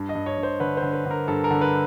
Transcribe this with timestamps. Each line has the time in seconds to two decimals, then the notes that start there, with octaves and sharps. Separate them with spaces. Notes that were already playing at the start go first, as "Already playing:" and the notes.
Already playing: G2
0.09 D#5
0.15 G2
0.26 C#5
0.38 G2
0.43 C5
0.60 D3 B4
0.77 C5
0.82 D3
0.93 B4
1.06 D3
1.11 A#4
1.28 G2 A4
1.44 A#4
1.51 D3
1.61 B4